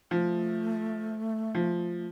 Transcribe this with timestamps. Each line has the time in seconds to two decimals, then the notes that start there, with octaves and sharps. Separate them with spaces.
0.11 F3 A3
1.55 F3